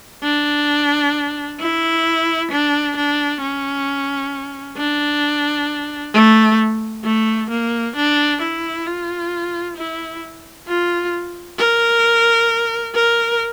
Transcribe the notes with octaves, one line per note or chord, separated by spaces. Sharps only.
D4
E4
D4
D4
C#4
D4
A3
A3
A#3
D4
E4
F4
E4
F4
A#4
A#4